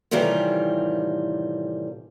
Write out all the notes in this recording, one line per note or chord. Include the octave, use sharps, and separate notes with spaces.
A2 C3 D#3 E3 G3 F4